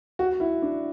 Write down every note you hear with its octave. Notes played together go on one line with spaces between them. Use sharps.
F#4
E4
D4